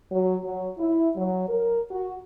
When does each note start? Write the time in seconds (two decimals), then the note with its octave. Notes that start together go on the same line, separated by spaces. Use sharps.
0.12 F#3
0.44 F#3
0.79 E4
1.15 F#3
1.47 A#4
1.91 F#4